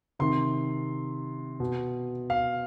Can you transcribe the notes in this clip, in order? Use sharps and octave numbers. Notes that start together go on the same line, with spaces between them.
C3 D#3 C6
B2
F5